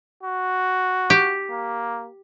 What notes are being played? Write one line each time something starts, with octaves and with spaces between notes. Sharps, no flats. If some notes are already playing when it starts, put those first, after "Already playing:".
F#4
G4
A#3